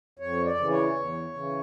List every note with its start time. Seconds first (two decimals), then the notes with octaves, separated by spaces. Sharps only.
0.19 F2 C#5
0.45 D5
0.57 C#3 E3
0.70 C#5
0.96 E2
1.34 C#3 E3